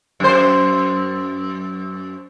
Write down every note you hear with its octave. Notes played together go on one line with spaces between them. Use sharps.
F#2 C5